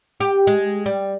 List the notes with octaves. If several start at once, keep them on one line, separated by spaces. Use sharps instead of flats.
G4
G#3
G3